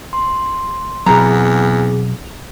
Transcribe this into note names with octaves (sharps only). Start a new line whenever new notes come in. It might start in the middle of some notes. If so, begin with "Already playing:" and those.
C6
E2 B2 F#3 C4 G#4 A#5